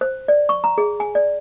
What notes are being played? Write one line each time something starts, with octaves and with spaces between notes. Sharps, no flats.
C5
D5
C#6
A#5
G#4
G#5
D5